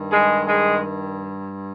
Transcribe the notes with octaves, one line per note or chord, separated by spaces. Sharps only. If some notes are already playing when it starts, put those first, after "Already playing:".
Already playing: G2 D#3
G#3 G#4
G#3 G#4